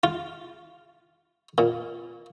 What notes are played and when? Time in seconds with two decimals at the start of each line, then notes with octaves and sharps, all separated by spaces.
0.04 F4
1.58 A#2